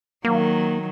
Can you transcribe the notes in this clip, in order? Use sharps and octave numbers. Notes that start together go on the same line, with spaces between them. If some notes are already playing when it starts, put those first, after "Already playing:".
D#3 F#3 A#3